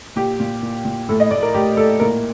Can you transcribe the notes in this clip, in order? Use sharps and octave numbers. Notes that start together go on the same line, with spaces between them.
A#2 G4
A#2
A#2
A#2
A2 A4
D#5
A2 D5
A#4
A2 G4
A2 A4
A#2 A#4